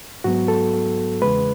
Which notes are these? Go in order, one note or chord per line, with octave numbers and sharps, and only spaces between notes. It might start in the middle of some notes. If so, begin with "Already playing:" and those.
G#2 F#3 B3 F#4
A4
E2 C#3 G#3 B4